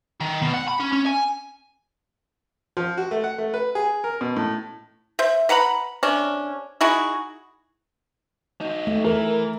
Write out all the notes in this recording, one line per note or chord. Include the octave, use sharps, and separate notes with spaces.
D#3
B2
F#5
B5
C#4
C#4
G#5
F3
F#4
A3
F#5
A3
B4
G#4
A#4
B2
A2
C5 E5
B4 F#5 A#5 B5
C3 C#4 D4
D#4 E4 F#4 G#4
D#4 F#4
A3
E3 A#4